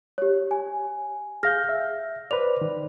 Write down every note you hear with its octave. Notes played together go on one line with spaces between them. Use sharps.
G4 C#5
G#5
G#4 F5 F6 G6 A#6
E5
B4 C5 D5 F7
D#3